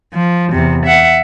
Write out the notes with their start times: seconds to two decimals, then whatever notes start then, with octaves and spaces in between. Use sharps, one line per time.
0.13 F3
0.53 E2 C3
0.86 E5 F#5